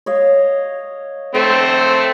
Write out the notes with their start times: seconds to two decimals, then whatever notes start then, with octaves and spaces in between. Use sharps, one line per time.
0.06 C#5 D#5 F5
1.35 A3 C4 G5